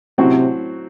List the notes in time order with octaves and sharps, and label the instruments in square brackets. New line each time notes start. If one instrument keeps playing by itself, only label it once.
[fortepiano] A2 F#3 C4 F#4 [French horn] C3